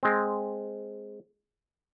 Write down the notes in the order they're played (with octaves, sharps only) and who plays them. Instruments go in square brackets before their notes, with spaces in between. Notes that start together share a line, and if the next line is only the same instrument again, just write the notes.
[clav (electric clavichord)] G#3 C4